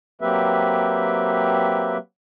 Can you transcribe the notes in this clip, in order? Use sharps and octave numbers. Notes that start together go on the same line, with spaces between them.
F#3 A#3 C4 G4 B4 E5